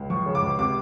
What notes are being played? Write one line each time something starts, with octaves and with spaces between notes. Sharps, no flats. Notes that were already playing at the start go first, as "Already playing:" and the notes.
Already playing: C#2
F3 C#6
C#3
D6
C#2
C3 D6